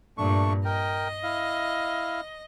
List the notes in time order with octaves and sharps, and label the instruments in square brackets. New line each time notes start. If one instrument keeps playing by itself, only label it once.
[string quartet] G2 A#2 [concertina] A3 D4 C#6
[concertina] A#4 G5 [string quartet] D#5
[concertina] E4 F5